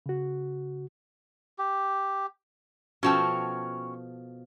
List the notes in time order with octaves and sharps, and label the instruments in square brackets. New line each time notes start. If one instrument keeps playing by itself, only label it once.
[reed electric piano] C#3 F#4
[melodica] G4
[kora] B2 F3 A4 [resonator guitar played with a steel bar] C#4 F#4 G5